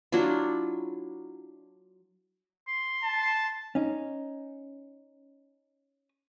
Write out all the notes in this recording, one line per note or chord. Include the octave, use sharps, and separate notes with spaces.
F#3 D4 E4 F4
C6
A5
C#4 D#4